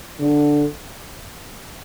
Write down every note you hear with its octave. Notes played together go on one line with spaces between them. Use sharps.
D3